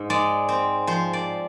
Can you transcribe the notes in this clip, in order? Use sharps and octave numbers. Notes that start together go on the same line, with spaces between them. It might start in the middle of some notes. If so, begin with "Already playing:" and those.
Already playing: G#2
G#3 D5
C4
F3 C5
D5